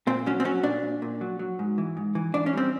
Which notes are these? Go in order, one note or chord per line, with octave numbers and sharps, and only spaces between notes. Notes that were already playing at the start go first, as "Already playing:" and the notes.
A#2 C4
F#3 C#4
C4
F#3 C#4
A#2 D4
A#2
A#2
F#3
F#3
G#2
E3
G#2
E3
E3 D4
C#4
G3 C4